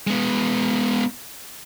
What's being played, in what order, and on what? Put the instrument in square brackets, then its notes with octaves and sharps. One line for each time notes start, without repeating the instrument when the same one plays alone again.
[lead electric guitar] G#3 B3